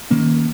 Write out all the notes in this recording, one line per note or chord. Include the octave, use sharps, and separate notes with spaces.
D#3 A#3 C#4